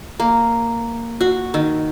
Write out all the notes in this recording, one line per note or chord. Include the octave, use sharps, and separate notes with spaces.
A#3
F#4
D#3